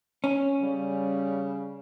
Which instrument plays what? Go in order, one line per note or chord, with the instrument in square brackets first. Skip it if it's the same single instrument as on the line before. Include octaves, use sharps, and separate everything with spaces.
[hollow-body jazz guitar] C#4
[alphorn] C#3 [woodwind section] G3